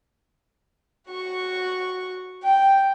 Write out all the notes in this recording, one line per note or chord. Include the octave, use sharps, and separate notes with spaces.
F#4 C#6
G5